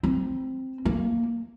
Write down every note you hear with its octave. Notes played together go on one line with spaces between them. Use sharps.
C4
A#3